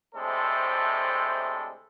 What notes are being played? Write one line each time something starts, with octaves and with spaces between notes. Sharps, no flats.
A2 C3 G#3 D4 A4 C5